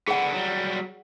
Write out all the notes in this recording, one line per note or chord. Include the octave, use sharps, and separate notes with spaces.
D3 B3 G#4 F#5
F#3 G3